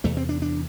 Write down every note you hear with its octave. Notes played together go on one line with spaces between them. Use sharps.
E2 C3 A3
C4
D4
D4